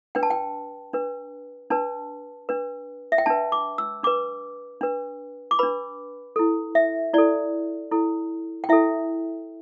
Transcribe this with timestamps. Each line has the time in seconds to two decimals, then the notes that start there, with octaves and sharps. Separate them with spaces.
0.15 D4 B4 G5
0.23 A5
0.30 G5
0.93 D4 B4
1.71 D4 B4 A5
2.49 D4 B4
3.12 E5
3.18 G5
3.26 D4 B4 A5
3.52 D6
3.78 E6
4.03 D4 B4 D6
4.81 D4 B4
5.51 D6
5.59 D4 B4 B5
6.36 E4 A4
6.75 E5
7.13 E4 A4 D5
7.91 E4 A4
8.64 G5
8.69 E4 A4 E5